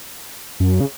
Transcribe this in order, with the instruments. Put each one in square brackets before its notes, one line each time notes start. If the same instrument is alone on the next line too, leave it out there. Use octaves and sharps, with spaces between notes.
[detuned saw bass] F#2
C#3